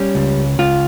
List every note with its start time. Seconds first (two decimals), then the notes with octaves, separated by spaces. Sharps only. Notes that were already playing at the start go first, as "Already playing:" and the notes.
Already playing: G3 C#4
0.15 C#2
0.59 C#2 F4